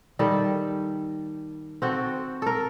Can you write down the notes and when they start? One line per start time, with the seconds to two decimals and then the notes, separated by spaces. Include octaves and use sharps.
0.19 D#3 G3 A4
1.82 C4 F#4 A4
2.42 A4 A#4